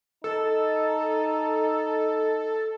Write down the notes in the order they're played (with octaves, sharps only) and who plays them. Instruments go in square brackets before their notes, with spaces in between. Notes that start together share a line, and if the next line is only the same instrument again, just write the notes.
[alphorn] D#4 [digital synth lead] A4